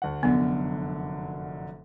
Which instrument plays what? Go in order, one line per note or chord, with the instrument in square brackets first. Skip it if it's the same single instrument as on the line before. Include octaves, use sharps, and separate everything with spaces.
[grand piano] D2 F#5
[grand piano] F1 F#2 D3 [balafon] B3